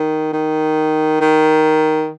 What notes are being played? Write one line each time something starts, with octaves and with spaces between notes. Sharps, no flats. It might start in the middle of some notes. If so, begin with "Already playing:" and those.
Already playing: D#3
D#3
D#3